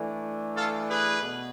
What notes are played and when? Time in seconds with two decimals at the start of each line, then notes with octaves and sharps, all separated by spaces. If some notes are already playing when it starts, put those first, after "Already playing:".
Already playing: E3 A3 D4
0.56 F4 A4
0.89 G#4 B4
1.22 B2